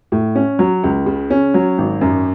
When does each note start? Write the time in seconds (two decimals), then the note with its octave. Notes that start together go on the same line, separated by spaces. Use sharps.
0.12 A2
0.35 C#4
0.59 F#3
0.84 C#2
1.06 C#3
1.30 C#4
1.54 F#3
1.78 G#1
2.01 F#2